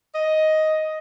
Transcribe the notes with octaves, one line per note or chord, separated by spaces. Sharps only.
D#5